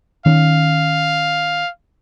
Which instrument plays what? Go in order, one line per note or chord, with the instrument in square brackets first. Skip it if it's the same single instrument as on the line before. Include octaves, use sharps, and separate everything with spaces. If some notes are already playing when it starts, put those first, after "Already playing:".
[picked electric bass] D#3 C#4 [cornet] F5